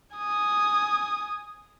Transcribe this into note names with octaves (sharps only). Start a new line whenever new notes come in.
G#5 D#6